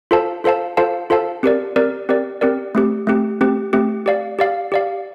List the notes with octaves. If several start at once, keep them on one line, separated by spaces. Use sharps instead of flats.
F4 A4 C5 F5 A5
F4 A4 C5 F5 A5
F4 A4 C5 F5 A5
F4 A4 C5 F5 A5
C4 G4 A#4 D5
C4 G4 A#4 D5
C4 G4 A#4 D5
C4 G4 A#4 D5
A3 C4 G4
A3 C4 G4
A3 C4 G4
A3 C4 G4
G4 D5 F5
G4 D5 F5
G4 D5 F5